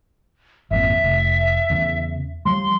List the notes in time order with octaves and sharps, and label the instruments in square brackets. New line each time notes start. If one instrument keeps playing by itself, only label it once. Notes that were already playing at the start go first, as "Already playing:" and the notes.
[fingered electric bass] G#1 F2 A#2 [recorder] E5
[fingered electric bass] F1
E2 C#3
[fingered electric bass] F3 G3 [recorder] C6